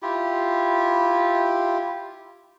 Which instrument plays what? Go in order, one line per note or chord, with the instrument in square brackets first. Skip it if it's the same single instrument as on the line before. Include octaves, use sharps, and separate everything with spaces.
[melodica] E4 F4 G4